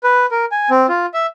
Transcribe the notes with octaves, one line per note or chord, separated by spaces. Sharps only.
B4
A#4
G#5
C4
F4
E5